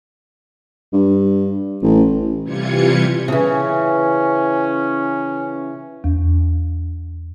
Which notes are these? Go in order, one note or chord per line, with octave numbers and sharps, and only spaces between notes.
G2
A1
C3 E3 G3 F4 G#6 C#7
C#3 E3 C#4
E2